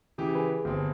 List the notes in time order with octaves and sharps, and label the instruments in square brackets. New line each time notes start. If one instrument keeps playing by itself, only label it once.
[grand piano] C#3 E3 G4
[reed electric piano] G#4 B4
[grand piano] G1 C4